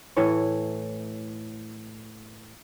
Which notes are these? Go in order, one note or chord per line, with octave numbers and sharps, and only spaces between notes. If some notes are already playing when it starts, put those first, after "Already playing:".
A2 E3 C#5